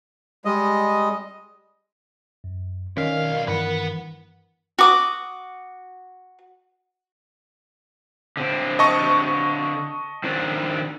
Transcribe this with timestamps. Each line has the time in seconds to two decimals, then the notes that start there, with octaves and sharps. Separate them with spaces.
0.45 G3 G#3 D#5
2.44 F#2
2.97 B1 D#3 C#4 A#4 D5 D#5 F5 B6
3.48 G2 D#3 E3 A#4 B4 F#5
4.79 F#4 D6 D#6
8.37 D3 C4
8.79 D#5 A5 C#6
10.24 D#3 C4 D4